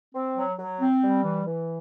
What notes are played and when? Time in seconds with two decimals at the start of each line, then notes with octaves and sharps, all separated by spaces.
0.14 C4
0.36 F#3
0.58 F#3
0.80 C4
1.02 G3
1.24 E3
1.46 E3